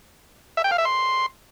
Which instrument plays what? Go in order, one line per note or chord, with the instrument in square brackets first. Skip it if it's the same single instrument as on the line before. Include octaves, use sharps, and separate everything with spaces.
[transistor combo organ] E5
G5
F5
E5
C6